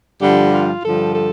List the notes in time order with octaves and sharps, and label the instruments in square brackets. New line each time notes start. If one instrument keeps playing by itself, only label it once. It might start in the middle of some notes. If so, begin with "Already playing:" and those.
[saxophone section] G2 D3 F3 G4
F4
G2 D3 F3 A4
A4